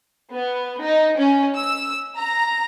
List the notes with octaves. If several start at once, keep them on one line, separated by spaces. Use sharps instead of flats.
B3
D#4
C#4
E6
A#5